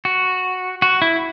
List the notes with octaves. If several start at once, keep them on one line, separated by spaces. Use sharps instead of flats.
F#4
F#4
E4